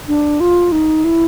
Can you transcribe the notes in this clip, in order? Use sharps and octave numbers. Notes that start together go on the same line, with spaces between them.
D4
F4
D#4
E4